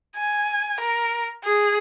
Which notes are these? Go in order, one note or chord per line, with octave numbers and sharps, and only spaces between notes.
G#5
A#4
G#4